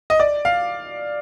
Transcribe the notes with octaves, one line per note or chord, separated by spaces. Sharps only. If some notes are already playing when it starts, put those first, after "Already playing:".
D#5
D5
F5